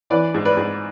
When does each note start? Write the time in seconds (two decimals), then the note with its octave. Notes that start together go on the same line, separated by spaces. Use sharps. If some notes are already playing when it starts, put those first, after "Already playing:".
0.10 E3 B4 D5
0.34 G#2
0.45 B4 D5
0.57 G#2